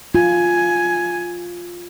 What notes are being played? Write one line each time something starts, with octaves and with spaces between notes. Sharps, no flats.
F4 G#5